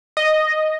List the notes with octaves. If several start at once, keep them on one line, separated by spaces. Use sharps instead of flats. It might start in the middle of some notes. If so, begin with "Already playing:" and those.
D#5